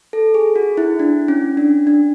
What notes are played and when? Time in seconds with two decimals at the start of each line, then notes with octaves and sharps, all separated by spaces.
0.13 A4
0.34 G#4
0.56 F#4
0.77 E4
1.00 D4
1.28 C#4
1.57 D4
1.87 D4